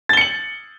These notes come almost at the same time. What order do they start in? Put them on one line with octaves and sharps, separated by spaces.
A6 G7 C#7 F#7